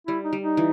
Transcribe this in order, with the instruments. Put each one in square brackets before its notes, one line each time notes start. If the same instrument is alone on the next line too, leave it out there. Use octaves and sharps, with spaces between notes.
[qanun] G3 [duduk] E4
[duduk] D#4
[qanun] G3
[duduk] D#4
[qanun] E3